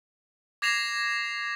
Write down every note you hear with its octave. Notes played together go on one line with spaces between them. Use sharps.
D6 G#6 A#6 C7 E7 F7